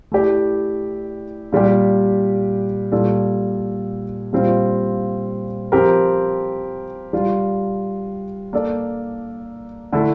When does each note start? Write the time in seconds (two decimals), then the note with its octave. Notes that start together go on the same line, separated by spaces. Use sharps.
0.12 A3 E4 G4 D5
1.52 A#2 G3 D4 G4
2.92 A#2 G3 D4 A4
4.33 A#2 G3 C4 F4
5.72 F3 C4 G4 A#4
7.13 G3 D4 F4
8.53 A#3 D4 A4 D5
9.93 D3 A3 E4 A4